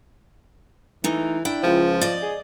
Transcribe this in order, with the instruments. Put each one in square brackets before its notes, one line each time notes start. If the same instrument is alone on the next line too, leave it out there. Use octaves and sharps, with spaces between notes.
[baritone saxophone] E3 [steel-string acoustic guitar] A3 D#4
[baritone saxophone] D4 [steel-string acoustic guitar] E4 G5
[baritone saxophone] C#2 [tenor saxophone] F3
[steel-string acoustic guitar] D5 D#5
[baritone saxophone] G#4